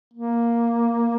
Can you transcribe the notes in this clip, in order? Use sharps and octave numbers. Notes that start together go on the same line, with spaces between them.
A#3